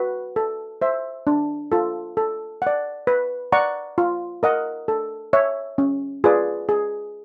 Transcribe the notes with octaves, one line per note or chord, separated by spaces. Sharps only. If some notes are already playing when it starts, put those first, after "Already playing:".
Already playing: F#4 B4
A4
C5 E5
D4
F4 A4
A4
D5 F#5
B4
D5 F#5 A#5 C#6
F4
A#4 D#5 F#5
A4
C#5 E5
C#4
F4 G#4 B4 D5
G#4